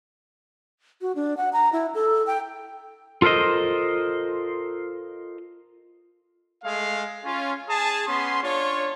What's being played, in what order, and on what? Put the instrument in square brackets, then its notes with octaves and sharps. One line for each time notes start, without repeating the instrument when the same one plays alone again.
[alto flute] F#4
D4
F#5
A#5
E4
A4
G5
[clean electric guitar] F4 A4 A#4 C5 D#5
[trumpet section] G#3 A3 F5
C#4 F4
G#4 A5
B3 C#4 C6
D4 F4 C#5